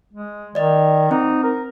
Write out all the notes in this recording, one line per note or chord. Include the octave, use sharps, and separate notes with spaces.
G#3
D#3 D5 D#5
C4 D#4
A#4